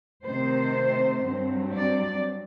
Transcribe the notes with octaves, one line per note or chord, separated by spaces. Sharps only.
C3 D#3 A3 C4 C5
G2 F#3 C4
D5